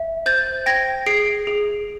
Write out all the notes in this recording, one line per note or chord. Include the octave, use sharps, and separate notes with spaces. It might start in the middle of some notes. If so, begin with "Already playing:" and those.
Already playing: E5
C5 G6 A6
G5 G#6 A#6
G#4 C7 D7
G#4